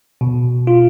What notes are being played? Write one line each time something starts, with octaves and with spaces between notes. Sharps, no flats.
B2
F4